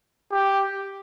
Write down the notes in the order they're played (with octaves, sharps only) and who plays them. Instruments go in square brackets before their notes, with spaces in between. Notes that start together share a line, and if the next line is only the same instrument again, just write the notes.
[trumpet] G4